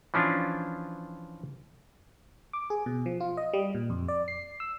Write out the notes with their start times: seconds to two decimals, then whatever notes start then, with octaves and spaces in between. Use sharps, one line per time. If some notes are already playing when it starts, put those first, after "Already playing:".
0.14 E3 F3 C#4 D4 F4
2.53 D6
2.70 G#4
2.86 B2
3.06 F3
3.20 F4
3.37 D#5
3.53 G3
3.75 A#2
3.90 F2
4.08 D5
4.28 C7
4.60 E6